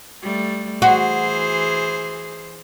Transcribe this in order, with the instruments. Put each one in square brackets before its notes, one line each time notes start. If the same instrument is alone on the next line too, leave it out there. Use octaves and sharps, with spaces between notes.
[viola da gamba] G3 A3
[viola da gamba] E3 G#4 C5 [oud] F#4